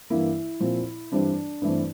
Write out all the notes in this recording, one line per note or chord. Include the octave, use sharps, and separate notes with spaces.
G2 E3 A#3 E4
A#2 F3 C4
G2 E3 G3 C4 D4
G2 E3 A3 C4